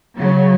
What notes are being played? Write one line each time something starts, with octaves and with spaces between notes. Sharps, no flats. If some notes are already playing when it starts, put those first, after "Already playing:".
C#3 F#3